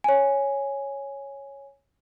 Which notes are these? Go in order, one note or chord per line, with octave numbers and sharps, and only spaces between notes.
C#5 G#5